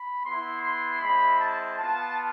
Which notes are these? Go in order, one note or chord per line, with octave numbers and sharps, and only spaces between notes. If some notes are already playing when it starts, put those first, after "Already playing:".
Already playing: B5
B3 E4 C6
C6
G#3 C4 E4 B5
A5
B3 F4 A5